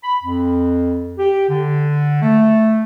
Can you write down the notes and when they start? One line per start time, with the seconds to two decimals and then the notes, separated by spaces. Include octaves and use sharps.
0.04 B5
0.24 F2
1.19 G4
1.50 D3
2.22 A3